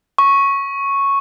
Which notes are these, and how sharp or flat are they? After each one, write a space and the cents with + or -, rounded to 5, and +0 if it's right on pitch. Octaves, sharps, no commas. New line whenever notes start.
C#6 -5